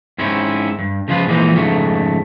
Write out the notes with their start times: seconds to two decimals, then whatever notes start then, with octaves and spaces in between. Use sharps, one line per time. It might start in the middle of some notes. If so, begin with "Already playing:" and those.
0.18 G#2 C4 C#4 E4
0.79 G2
1.08 C#3 F3 G#3 F4 B4
1.28 A#2 E3 F3 G#3 C4 D#4
1.54 F2 G#2 C#3 A3